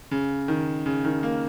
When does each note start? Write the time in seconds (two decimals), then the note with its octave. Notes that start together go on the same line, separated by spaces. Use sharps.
0.11 C#3
0.48 D#3
0.86 C#3
1.05 D#3
1.23 A#3